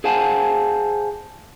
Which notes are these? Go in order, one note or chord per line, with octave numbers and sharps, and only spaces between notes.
G#4 C5 F5 F#5 G#5 A5